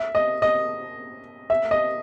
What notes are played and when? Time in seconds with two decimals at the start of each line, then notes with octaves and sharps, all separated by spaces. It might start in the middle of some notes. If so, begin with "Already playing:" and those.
Already playing: E5
0.15 D#5
0.42 D#5
1.50 E5
1.71 D#5